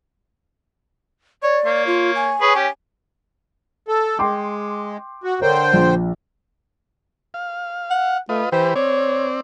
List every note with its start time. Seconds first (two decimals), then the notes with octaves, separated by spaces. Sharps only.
1.43 C#5 D5
1.65 A#3 C#5
1.87 F4
2.16 G#5
2.41 G#4 B4 C#5
2.55 C#4 G4
3.88 A4
4.19 G#3 G5 C6 D6
5.24 F#4
5.42 D3 A#4 C5 C#5 G5
5.73 A#1
7.34 F5
7.90 F#5
8.29 A3 F4 B4 D#5
8.52 E3 G4 B4 C5
8.76 C4 C#5 D5